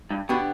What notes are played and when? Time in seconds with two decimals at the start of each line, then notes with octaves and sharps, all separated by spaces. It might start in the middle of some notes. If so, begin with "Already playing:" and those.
0.11 G2
0.29 B2 D3 B3 D4 G4